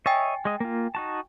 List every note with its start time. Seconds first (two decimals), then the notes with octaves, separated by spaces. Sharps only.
0.06 C#5 D#5 E5 G5 G#5 A6
0.45 G#3 D#5
0.60 A#3 F4
0.95 D#4 F#4 A5